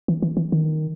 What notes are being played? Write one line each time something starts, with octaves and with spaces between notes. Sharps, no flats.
E3
E3
E3
D#3